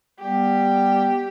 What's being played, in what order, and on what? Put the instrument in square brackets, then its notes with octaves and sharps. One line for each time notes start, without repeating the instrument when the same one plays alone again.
[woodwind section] G3 B3 [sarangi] G4